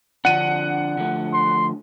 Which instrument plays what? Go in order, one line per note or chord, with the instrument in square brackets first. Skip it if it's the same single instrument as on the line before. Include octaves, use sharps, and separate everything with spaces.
[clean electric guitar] D3 F3 D4 [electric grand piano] F#5 D#7
[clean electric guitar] D3 F3 A3
[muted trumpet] C6